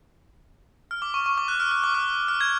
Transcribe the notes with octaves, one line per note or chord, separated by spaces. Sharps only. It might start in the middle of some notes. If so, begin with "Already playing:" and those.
F6
D6
C#6
C#6
D6
F#6
F6
F6
D6
F6
F6
G#6